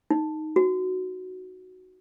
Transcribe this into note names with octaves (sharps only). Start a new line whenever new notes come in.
D#4
F#4